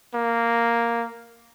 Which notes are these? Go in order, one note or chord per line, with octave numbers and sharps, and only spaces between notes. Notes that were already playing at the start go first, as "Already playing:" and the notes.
A#3